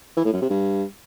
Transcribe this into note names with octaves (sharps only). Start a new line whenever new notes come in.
E3
A2
F#2
C3
G2